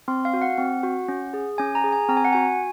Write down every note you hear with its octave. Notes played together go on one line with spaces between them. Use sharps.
C4 C6
F5
F#4
F#5
C4
F#4
C#4
G#4
C#4 G#5
A#5
G#4
G#5
C4 A#5
G#5
F#5
F#4 G#5